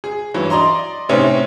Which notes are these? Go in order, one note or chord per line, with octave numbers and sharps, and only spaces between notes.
G#4
G2 E3 F#3
D5 D#5 A#5 C6
A2 C3 C4 C#4 D#4